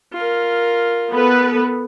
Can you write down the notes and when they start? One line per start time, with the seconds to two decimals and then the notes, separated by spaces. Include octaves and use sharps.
0.13 F4 A#4
1.11 B3 A4 B4